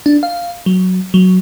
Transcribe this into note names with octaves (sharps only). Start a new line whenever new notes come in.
D4
F5
F#3
F#3